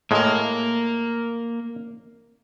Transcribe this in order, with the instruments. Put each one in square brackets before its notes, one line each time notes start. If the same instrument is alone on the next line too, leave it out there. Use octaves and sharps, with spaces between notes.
[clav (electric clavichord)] A2 G#3 [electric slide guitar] A#3 A#4